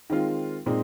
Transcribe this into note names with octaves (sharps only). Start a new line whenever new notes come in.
D#3 G#3 C4 F4
A#2 G#3 C4 D#4